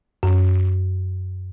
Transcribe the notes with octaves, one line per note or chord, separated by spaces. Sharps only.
F#2